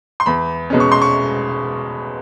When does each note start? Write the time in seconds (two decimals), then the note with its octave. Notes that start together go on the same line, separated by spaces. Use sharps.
0.20 C6
0.26 E2 B5
0.70 B2 G#3 C#4
0.80 C#6
0.92 C6
1.02 C#6